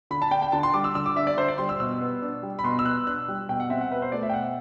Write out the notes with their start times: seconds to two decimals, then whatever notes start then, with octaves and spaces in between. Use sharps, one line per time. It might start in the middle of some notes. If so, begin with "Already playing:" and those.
0.11 D3 B5
0.22 A5
0.31 D4 G5
0.42 G5
0.52 D3 A5
0.63 C6
0.74 G3 D6
0.84 E6
0.95 D3 E6
1.06 D6
1.16 D4 E5
1.27 D5
1.37 D3 C5
1.48 D5
1.58 G3 C6
1.69 E6
1.80 B2 E6
2.01 B3
2.22 D4
2.43 G3
2.59 B5
2.64 B2 C6
2.79 E6
2.86 B3 F#6
3.07 D4 F#6
3.28 G3
3.49 B2 G5
3.60 F#5
3.70 C4 E5
3.81 F#5
3.91 B2 B4
4.02 C5
4.12 A3 D5
4.23 E5
4.30 G5
4.33 B2 F#5